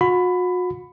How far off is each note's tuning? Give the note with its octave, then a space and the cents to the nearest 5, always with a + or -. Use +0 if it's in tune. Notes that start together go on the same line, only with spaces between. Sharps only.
F#4 -40 B5 +20